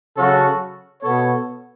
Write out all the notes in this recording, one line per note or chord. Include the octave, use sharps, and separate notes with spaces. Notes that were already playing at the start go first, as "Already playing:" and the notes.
C#3 F#3 C#4 F#4 A4
B2 B3 A4 C#5